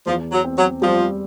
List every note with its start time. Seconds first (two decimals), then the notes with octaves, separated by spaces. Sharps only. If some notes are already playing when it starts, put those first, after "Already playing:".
0.06 E2 F3
0.32 F#3
0.44 C4
0.57 F#3
0.82 F3 G3